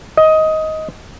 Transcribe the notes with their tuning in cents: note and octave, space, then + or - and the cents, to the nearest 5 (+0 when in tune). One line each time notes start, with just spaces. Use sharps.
D#5 +15